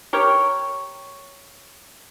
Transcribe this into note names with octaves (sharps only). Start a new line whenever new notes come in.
G4 A#4 C#5